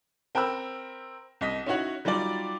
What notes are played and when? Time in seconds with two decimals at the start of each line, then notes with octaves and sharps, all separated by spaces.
0.35 C4 A#4 G5 B5 E6
1.41 C2 D#5 B6
1.66 C#4 D#4 E4 F#4 C#5 F#5
2.05 F#3 G3 D#4 F4 D5